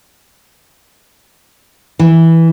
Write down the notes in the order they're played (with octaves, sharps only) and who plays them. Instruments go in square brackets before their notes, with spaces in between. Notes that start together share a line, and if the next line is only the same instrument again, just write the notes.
[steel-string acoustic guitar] E3